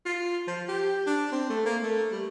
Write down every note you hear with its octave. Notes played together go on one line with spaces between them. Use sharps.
F4
F3
G4
D4
C4
A3
A#3
A3
G3